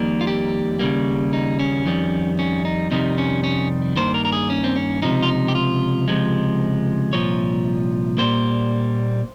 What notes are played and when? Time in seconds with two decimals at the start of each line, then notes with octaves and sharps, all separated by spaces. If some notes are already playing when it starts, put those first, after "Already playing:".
Already playing: F2 D#3 G3 A#3
0.21 F4
0.27 G4
0.79 D#2 C#3 G3 A#3
1.33 D#4
1.60 C#4
1.85 F2 D#3 G3
2.39 C#4
2.65 D#4
2.91 F2 C3 D#3 G3 D#4
3.18 C#4
3.44 C#4
3.96 G2 D#3 A#3 C5
4.14 A#4
4.25 A#4
4.32 G#4
4.50 C#4
4.64 C4
4.76 C#4
5.02 C#2 C3 F3 D#4
5.23 F4
5.29 D#4
5.48 G4
5.55 F4
6.08 C#2 C3 F3 G#3
7.13 C2 A#2 F3 C#5
8.18 A#2 G3 A#3 C5